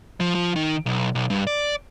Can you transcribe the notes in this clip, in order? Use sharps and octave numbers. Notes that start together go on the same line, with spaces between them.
F3
F3
D#3
B1
B1
G2
D5